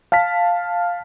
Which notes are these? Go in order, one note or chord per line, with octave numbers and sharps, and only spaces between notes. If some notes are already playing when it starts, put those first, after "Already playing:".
F5 A5 F6 B6